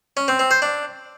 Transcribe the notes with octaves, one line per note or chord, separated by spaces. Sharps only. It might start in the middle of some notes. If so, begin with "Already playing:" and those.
C#4
C4
C4
C5
D4